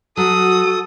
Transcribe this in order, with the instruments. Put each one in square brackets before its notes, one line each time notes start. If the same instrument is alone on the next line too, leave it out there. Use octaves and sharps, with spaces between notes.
[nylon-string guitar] F#3 [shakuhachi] F#4 [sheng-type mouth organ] A4 [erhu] D#6